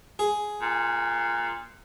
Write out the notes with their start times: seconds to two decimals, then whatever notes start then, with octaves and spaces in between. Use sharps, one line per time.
0.19 G#4
0.62 A#2